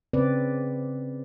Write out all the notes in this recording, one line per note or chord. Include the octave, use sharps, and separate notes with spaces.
C#3 C4 B4 D5